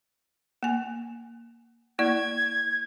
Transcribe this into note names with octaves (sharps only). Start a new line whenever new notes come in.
A#3 G#5
A#3 E4 D5 G#6